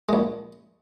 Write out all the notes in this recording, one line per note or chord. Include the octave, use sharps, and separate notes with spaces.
A#1 G#3